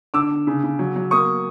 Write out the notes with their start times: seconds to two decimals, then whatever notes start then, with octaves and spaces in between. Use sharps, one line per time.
0.14 D3 D6 E6
0.31 D3
0.47 C#3
0.63 C#3
0.79 F#3
0.96 F#3
1.11 A#3 C#6 D#6